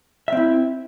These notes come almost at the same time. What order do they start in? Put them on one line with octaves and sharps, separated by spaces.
E5 C4 E4